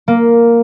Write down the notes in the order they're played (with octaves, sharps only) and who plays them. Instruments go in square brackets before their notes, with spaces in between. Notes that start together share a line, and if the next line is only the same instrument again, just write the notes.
[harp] A#3